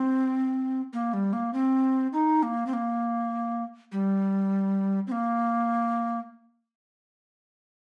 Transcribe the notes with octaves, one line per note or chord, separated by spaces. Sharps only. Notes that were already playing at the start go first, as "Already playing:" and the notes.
Already playing: C4
A#3
G3
A#3
C4
D#4
A#3
C4
A#3
G3
C4
A#3